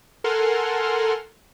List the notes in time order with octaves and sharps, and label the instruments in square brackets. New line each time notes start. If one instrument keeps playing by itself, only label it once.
[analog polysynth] A4 A#4 F#5 G#5 C6 F6